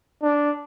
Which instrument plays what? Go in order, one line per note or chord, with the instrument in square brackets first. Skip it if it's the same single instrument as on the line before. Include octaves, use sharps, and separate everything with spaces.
[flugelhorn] D4